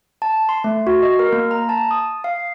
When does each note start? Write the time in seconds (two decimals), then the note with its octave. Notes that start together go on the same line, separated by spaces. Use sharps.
0.22 A5
0.49 C6
0.64 A3
0.87 F#4
1.03 D#5
1.19 A#4
1.32 A#3
1.51 A#5
1.69 A5
1.91 D#6
2.24 F5